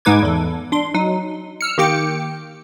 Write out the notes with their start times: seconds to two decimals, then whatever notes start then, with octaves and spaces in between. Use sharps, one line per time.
0.05 G#2 G#3 D#4 B4 D6 G#6
0.23 E2 A4
0.72 D4 C6
0.94 F#3 D#4
1.61 E6 F6 C#7
1.78 D#3 A#3 G4 G5 D6 C#7